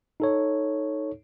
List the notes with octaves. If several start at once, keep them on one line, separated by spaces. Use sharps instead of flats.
D#4 A4 C#5